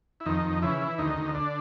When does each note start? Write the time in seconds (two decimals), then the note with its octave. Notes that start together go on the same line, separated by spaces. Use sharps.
0.20 E4
0.26 F2 D#3 D#4
0.45 F2
0.62 C#3 E3 E4
0.81 E3
0.98 D2 D#3 D#4
1.17 D2
1.35 D3 D4